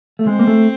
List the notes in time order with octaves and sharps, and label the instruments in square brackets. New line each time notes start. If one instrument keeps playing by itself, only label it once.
[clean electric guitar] A3
[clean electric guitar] G#3 [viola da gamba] C4
[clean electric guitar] A#3
A3